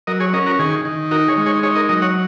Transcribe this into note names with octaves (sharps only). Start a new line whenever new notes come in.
F#3 A#4 D#5
G#4 C#5
C#4 A#4 D#5
F#4 A#4
D#3 G#4
D#3
D#4 F#4 A#4
G#4 C#5
G#3
G#4 C#5
D#4 G#4 C#5
A#4 D#5
F#3 A#4 D#5
C#5 F#5